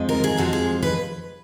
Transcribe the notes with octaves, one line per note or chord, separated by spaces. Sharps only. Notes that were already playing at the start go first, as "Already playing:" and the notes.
Already playing: F2 F3 G#3
A#4
G#4
F2 F3 G#3 F#4
G#4
B4